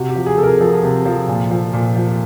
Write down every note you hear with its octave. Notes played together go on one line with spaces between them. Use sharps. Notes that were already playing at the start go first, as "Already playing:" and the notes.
Already playing: C3 F#4
G4
F3
G#4
C3 A4
A#4
F3 A4
C3
F3
A#2
F3
A#2
F3